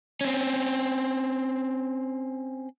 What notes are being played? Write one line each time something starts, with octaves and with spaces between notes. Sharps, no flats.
C4 C#4